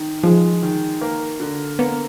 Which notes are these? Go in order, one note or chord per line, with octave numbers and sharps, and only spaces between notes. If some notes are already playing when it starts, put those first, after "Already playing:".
Already playing: D#3
F3 G#3
D#3
A#3
D3
A#3 B3